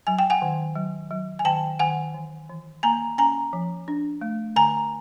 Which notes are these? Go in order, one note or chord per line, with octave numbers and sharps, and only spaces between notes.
F#3 G#5
G5
F#5 G#5
D#3
F#3
F#3
G#5
D#3 G5 A5
D#3 F#5 G#5
E3
E3
A#3 G#5 A#5
C#4 G#5 A#5
F3
D4
A3
D3 G#5 A#5